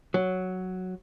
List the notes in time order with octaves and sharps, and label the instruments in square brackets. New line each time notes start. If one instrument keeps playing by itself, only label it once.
[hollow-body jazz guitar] F#3